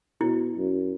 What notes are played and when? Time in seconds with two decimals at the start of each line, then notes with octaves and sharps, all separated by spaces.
0.21 B2 E4
0.55 F#2